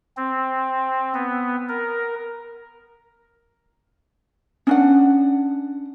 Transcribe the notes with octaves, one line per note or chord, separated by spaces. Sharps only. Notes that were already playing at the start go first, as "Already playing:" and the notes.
C4
B3
A#4
C#4 D4 F#5